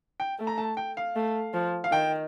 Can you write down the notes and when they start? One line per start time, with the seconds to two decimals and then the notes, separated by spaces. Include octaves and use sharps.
0.20 G5
0.39 A3
0.47 A#5
0.58 A5
0.77 G5
0.97 F5
1.16 A3
1.54 F3
1.84 F5
1.92 D#3 G5